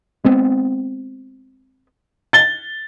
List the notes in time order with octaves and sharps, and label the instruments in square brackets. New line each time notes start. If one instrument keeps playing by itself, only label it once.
[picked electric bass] G#3 B3 C4
[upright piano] A6 G7